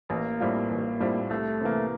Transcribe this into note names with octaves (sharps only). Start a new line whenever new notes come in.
A1 A#3
A2 G3 C4 F4
A1
A2 G3 C4 F4
C2 A3
C3 E3 A#3